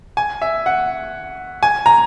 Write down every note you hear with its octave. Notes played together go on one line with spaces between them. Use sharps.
G#5
E5
F#5
G#5
A#5